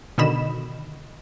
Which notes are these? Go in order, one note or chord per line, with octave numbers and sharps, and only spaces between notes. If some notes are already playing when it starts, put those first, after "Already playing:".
B2 D3 D#3 D#5 B5 E7